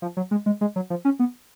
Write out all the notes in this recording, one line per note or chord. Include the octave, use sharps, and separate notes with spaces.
F3
F#3
G#3
G#3
G#3
F#3
F3
C#4
B3